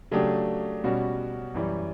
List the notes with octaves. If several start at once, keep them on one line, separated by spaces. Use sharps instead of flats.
C#3 F#3 A3 D4 G4
B2 G3 C#4 F#4
F#2 E3 G3